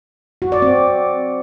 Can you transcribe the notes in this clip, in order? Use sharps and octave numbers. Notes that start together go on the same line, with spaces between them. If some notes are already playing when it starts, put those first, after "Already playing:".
F#4
D5
C4